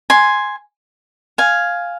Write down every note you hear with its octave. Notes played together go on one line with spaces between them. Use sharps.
G#5 C6
F5 G#5